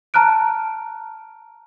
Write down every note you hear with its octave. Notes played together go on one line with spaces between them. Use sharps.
A5 A#5 F6 F#6 D7